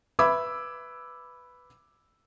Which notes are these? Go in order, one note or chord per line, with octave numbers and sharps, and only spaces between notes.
B4 E5 B5 D6 E6 G#6